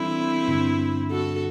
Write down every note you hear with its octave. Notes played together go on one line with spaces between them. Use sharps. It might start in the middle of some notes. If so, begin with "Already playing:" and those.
Already playing: E3 G3 C4 D4 E4 A4 D5
G2 D3 G3 D4
F#4 A4